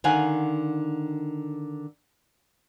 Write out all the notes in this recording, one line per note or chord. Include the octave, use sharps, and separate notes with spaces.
D3 D#3 F5 F#5 G#5